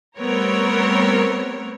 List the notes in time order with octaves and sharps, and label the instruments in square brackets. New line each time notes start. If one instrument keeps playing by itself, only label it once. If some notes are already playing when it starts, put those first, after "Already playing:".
[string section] G3 A3 B3 C4 A#4 C#5